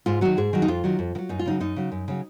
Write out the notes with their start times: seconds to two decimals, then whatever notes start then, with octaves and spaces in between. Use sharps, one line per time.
0.06 G#2 F4
0.21 D#3 F#3 F#4
0.37 G#2 G#4
0.53 D#3 F#3
0.62 D#4
0.68 F2 F4
0.84 D#3 F#3
0.99 F2
1.15 D#3
1.19 F#3
1.29 F#2 D#4
1.39 F4
1.46 C#3 F#3 D#4
1.60 F#2 D#4
1.76 C#3 F#3
1.92 F#2
2.08 C#3 F#3